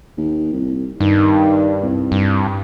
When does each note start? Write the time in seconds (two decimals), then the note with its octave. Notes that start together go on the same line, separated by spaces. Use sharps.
0.17 D#2
0.53 C2
1.00 G2 D#3
1.83 C2
2.12 G2